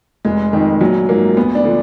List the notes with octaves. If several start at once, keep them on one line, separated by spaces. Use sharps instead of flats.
F1 G#3
F2 D#3
A#1 F#3
G#2 F3 A#3
D2 B3
D4
D3 F3